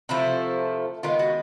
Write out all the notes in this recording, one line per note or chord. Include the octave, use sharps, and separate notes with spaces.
C3 F3 A3 E4
D#3 G#3 B3 F4
F#4